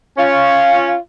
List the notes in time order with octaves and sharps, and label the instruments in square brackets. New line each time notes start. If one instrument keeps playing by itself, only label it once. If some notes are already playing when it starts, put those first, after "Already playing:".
[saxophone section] C#4 F4